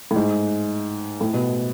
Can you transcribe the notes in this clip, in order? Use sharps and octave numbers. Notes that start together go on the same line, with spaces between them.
A2
G#2
A2
B2